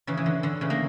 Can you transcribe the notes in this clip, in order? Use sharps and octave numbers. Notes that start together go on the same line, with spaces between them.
C#3 E3
E3
D3
D3
C#3 E3
A#3